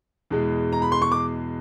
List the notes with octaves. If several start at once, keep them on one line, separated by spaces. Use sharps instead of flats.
E2 B2 G#3
A#5
B5
C6
C#6
D6